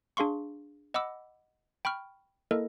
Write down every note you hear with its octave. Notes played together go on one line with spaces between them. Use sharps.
D4 G#4 F5 C6 C#6
D#5 F#5 B5 D6 E6
G5 B5 C#6 F6
A#3 E4 A4 A#4 D#5